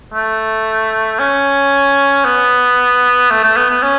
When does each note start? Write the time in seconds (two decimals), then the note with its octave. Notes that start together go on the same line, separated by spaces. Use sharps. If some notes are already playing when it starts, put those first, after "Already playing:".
0.14 A3
1.19 C#4
2.25 B3
3.30 A3
3.43 A3
3.56 B3
3.70 B3
3.83 C#4